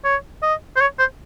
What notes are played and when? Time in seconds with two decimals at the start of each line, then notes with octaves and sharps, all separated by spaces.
0.04 C#5
0.43 D#5
0.76 C5
0.81 C#5
0.99 C5